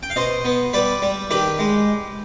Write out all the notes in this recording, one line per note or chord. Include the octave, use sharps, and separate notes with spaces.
G5
F5
B2 C5 D#5
B3
G3 B4 D5
G3
D#3 G4 B4
G#3